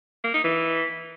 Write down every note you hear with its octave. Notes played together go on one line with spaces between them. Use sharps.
A#3
D#4
E3